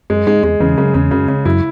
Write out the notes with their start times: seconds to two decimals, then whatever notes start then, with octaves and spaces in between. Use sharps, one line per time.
0.10 F#2 G#3
0.27 G#2 G#3
0.43 E2 G#3
0.60 E2 C#3
0.78 F#2 C#3
0.94 E2 C#3
1.11 F#2 C#3
1.28 C#3
1.45 F#2 E4